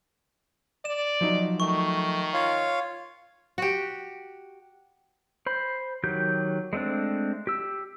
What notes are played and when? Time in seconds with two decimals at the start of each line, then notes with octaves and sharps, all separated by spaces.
0.85 D5 E7
1.21 F3 F#3 D#4
1.60 D#3 A3 C#6
2.34 F4 C#5 F5
3.58 F#4 G4
5.46 C5 B5
6.03 D#3 F#3 G4 G6
6.73 G#3 A3 C4 D4
7.47 G4 E6